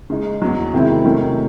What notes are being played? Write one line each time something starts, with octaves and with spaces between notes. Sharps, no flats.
C#3 G#3 D#4
E2 C#3 F#3
C3 D#3 G#3 C4 E4
C3 D#3 F#3 A3 C#4